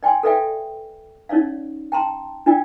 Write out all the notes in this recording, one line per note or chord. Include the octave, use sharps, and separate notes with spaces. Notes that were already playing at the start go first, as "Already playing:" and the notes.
D5 G5 G#5 C6
A4 B4 D5 E5 F5 G5
C#4 D#4 C#5 D5 F5
G5 A5 A#5 C6
D4 F4 D5 G5